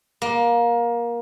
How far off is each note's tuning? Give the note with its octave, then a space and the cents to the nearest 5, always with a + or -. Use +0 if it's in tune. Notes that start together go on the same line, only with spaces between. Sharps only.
A#3 +20